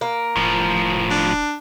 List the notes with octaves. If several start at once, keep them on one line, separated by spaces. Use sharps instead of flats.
A#3
E1 A2 F3
D4